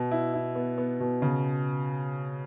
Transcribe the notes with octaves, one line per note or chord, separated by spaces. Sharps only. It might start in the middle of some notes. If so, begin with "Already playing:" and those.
Already playing: B2
E4
E4
B3
B3
B2
C#3